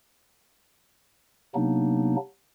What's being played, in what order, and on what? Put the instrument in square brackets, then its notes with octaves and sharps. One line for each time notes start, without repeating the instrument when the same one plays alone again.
[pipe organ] C3 F#3 A#3 B3 D4 D#4